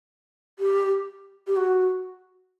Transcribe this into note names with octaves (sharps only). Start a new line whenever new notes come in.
G4
G4
F#4